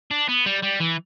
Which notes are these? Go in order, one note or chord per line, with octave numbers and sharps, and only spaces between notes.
D4
B3
G3
G3
E3